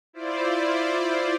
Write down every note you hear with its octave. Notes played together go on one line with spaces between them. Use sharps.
E4 F4 C5 D5